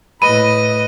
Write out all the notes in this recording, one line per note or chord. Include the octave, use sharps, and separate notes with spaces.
A2 B4 D#5 B5 D#7